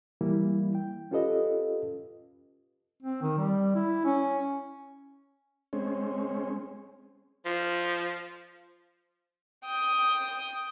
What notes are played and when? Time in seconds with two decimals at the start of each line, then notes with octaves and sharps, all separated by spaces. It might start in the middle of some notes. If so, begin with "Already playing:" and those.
0.21 E3 G3 A#3 E4
0.75 G5
1.11 C#4 F4 G4 A4 B4 D#5
3.02 C4
3.22 D#3
3.38 G3
3.75 E4
4.05 C#4
5.73 G#3 C4 C#4
7.46 F3
9.66 G5 D#6